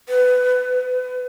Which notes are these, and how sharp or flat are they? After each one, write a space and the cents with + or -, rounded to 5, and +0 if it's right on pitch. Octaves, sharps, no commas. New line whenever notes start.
B4 +20
B4 +30